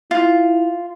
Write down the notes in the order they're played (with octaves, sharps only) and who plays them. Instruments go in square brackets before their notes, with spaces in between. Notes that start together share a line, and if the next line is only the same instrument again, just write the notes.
[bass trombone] E4 [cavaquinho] F4